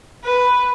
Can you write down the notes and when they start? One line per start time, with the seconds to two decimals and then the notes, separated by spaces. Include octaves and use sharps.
0.24 B4